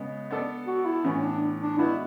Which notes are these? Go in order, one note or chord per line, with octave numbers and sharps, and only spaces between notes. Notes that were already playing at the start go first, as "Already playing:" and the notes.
Already playing: C#3 G#3 B3
B3 D4 A4 D5
F#4
E4
A2 E3 B3 C#4
D4
D4
G#3 B3 D4 E4 F#4 B4